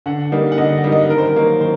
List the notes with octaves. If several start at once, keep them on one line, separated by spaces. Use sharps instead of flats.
D3 F#5
G3 A#3 D#4
F#5
D3 D#5
G3 A#3 D#4
D#5
D#3 A#4
C5
A#4
F#3 A#3 D#4
D#3 C5